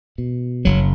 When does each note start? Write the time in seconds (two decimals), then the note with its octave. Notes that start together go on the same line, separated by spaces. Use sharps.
0.18 B2
0.65 F#1 F#3